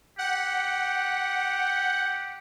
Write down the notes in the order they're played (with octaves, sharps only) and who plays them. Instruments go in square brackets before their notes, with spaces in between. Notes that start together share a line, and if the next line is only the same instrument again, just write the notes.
[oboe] G4 [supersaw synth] F#5